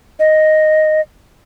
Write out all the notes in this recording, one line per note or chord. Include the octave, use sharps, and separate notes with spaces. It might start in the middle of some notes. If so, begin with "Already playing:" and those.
D#5